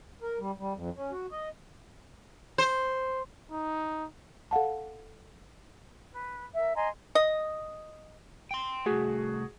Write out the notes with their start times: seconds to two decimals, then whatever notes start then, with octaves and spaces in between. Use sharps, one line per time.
0.22 A#4
0.39 G3
0.59 G3
0.75 F2
0.96 C#4
1.11 F#4
1.31 D#5
2.58 C5
3.51 D#4
4.51 A4 F5 F#5 A5
6.14 B4
6.55 A#4 E5
6.76 D#5 G#5 A#5 C6
7.15 D#5
8.51 G5 C6
8.86 C2 A3 F#4 G#4